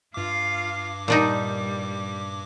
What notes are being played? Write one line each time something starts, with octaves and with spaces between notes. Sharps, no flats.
G2 F4 F5 D6
A#2 G3 D4 D#4